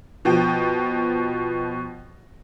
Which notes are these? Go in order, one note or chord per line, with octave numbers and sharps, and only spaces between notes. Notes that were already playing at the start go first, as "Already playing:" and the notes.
B2 F3 G5